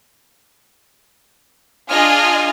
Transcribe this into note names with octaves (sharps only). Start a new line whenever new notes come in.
D4 F4 G#4 D#5 G#5 F6